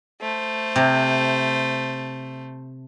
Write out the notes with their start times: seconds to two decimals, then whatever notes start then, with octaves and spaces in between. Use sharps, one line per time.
0.21 A3 C5
0.76 C3